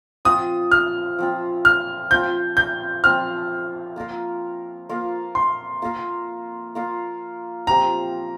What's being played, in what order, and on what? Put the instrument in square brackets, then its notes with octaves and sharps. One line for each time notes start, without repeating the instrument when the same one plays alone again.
[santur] F3 C4 F4 [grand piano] D#6
[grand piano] F6
[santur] F3 C4 F4
[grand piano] F6
[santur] F3 C4 F4 [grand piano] G6
[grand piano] G6
[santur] F3 C4 F4 [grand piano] F6
[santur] A#3 F4 A#4 F5
A#3 F4 A#4 F5
[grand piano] C6
[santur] A#3 F4 A#4 F5
A#3 F4 A#4 F5
[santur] F3 C4 G4 C5 [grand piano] A#5